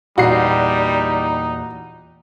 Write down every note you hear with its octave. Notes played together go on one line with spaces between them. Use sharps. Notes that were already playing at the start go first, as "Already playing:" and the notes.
E2 A#2 G3 D#4 F#4 C7